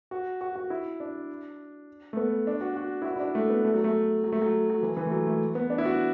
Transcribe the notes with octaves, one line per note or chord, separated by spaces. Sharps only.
F#4
F#4
F#4
E4
D4
A3
B3
D4
F#4
F#4
E4
F#4
E4
D4
A3
B3
A3
F#3
A3
F#3
A3
F#3
F#3
E3
E3
A3
F#3
A3
B3
D4
E4
F#4